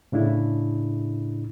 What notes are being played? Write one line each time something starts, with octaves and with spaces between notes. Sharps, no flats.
A2 C#3 D4 E4